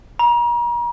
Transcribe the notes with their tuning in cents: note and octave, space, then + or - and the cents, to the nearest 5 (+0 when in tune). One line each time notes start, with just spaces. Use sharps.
A#5 +40